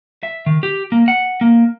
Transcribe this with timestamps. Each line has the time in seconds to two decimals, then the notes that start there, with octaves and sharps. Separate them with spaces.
0.23 E5
0.46 D#3
0.63 G4
0.92 A#3
1.08 F#5
1.41 A#3